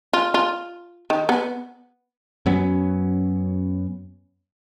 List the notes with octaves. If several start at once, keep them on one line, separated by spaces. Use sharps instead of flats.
F4
F4
D#3
B3
F#2 F#3 B3 C#4